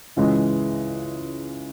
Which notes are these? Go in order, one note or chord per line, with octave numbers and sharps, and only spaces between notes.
C#2 C#3 E3 G#3